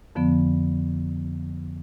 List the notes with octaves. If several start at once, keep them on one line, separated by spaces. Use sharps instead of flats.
F2 D3 F3 B3